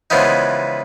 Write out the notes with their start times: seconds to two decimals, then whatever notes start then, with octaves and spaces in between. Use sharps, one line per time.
0.10 C#3 E3 F3 G#3 B3 D#4